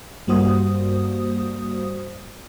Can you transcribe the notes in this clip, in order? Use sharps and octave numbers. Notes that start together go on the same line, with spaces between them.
G2 G3 A#3 F#4 C5 D#6